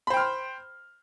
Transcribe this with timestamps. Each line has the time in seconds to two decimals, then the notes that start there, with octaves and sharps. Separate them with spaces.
0.07 B5
0.10 C5
0.14 G5
0.17 F6
0.20 C6